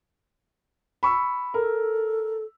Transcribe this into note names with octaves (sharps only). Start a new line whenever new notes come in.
B5 C#6 E6
A4 A#4